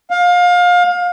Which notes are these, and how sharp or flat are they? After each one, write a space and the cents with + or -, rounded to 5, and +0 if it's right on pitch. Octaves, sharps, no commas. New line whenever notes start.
F5 +25